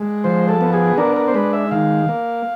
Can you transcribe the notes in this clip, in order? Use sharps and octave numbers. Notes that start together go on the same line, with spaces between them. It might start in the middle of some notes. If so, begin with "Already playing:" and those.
Already playing: G#3
F3 C5
A4
B3
G#4
D4 A#4
A#4
C5
G#3 B4
E5
D#3 F5
A#3